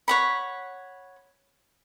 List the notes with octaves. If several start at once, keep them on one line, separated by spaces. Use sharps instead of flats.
C#5 F#5 B5